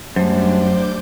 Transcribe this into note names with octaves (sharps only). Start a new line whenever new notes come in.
F#2 F#3 G3 A3 D4 C5
D6 G6